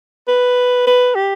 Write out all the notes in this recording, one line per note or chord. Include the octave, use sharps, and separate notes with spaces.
B4
B4
G4